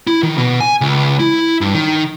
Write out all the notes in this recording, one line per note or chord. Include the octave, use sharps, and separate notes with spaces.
E4
D#3
B2
G#5
C#2
E4
G2
D#3